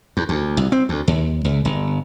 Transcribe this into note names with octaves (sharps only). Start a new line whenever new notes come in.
E2
D2
C2
C4
D2
D#2
C#2
G1